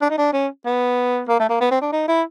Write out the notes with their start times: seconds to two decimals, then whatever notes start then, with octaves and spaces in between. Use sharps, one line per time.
0.02 D4
0.10 D#4
0.18 D4
0.33 C#4
0.65 B3
1.28 A#3
1.40 A3
1.49 A#3
1.61 B3
1.71 C4
1.81 D4
1.92 D#4
2.08 E4